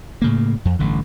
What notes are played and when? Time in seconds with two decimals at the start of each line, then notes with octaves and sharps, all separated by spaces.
0.22 A2 C#3 A#3
0.65 F2
0.79 A1 G2 D3